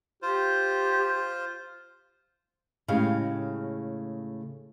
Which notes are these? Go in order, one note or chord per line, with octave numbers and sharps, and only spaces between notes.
F4 G4 C5
A2 C#3 G#3 G4 F5